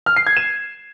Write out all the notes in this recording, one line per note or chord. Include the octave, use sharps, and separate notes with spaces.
F6
C7
G#6
E7